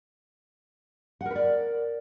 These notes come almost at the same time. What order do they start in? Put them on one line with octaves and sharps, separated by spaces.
F#5 A#4 B4 D5